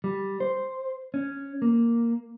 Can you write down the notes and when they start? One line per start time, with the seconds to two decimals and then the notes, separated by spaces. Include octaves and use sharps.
0.04 G3
0.40 C5
1.14 C#4
1.62 A#3